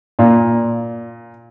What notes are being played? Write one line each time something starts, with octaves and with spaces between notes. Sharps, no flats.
A#2